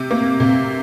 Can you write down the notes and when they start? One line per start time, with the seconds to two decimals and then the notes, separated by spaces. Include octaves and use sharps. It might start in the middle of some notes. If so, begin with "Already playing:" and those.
Already playing: C3
0.11 A#3
0.40 C3